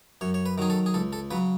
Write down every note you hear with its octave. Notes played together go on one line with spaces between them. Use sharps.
F#2 C#5
C#5
B4
D#3 F#3 G#4
A4
G#4
C#2 A4
A4
C#3 F#3 B4